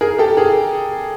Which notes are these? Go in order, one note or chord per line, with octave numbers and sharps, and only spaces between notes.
G#4 A#4
G4 A4
G#4 A#4